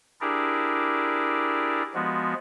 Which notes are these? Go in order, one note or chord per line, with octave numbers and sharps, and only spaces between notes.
D4 E4 G4 G#4 A#4 D5
F3 G#3 B3 F#4